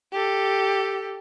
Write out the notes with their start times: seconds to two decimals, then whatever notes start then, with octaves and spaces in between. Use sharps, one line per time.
0.13 G4 A4